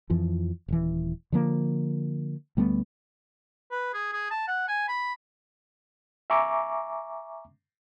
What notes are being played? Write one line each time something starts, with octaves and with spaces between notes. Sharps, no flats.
F2 E3 F3
D#1 E3
D3 F3 A#3
D2 G3 A3 B3
B4
G#4
G#4
A5
F#5
G#5
B5
E5 G#5 A#5 C#6 D6